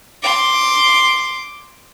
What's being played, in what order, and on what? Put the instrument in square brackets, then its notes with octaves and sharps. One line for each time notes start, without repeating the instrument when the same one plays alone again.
[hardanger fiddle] C6 D6